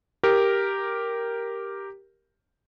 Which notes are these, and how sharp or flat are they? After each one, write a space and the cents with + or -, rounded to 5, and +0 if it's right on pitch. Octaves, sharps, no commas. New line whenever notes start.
G4 +0 A#4 +0